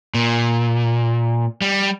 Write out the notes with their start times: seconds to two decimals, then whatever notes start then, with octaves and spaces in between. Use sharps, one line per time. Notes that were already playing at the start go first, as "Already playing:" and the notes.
0.14 A#2
1.62 G3